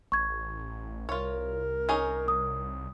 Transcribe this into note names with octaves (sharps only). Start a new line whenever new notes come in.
A1 C#6 G#6
C2 F4 A#4 C#5
C#4 D#4 G#4
D#6